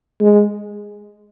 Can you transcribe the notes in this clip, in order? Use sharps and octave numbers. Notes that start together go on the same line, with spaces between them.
G#3